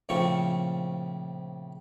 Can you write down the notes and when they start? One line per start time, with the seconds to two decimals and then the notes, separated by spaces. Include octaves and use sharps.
0.09 A#1 A2 C#3 F3 C4 C#6